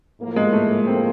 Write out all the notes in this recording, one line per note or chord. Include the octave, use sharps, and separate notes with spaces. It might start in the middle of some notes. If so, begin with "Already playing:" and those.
A2 F3 A#3
G#3
A3
C4